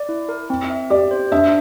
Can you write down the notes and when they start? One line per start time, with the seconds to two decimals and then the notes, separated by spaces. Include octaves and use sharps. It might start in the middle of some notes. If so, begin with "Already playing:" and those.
Already playing: D5
0.09 E4
0.29 A#4
0.50 C4
0.70 E5
0.90 G4 D5
1.11 C5
1.32 D4 E5